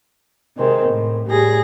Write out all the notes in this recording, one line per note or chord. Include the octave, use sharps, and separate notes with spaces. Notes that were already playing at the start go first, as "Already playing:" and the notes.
C3 D#3 G#3 C4
A2
A2 G3 G#4 A#6